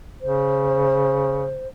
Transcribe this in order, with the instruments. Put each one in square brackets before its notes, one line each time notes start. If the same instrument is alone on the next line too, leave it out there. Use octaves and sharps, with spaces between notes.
[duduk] C#3 [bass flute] C5